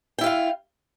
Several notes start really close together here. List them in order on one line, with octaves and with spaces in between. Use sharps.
G5 E4 F4 F5